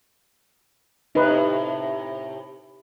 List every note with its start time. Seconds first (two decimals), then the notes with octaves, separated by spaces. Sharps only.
1.15 A2 C3 D#4 B4